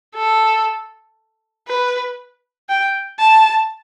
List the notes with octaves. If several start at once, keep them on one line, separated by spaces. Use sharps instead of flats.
A4
B4
G5
A5